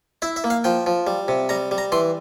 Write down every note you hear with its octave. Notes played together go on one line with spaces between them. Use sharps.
E4 E5
E5
A#3
F5
F3 G5
F3
G3
C3
G3 A#5
G3
A#5
E3 C6